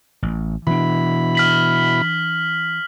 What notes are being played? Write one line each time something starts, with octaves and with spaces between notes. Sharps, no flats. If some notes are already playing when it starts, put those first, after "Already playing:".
A1
B2 E3 D4 E4 B5
F6 B6 F#7